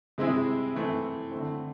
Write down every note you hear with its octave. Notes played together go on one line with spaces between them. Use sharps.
C3 G#3 C4 E4 G#4
E3 A3 C4
D3 A3 C4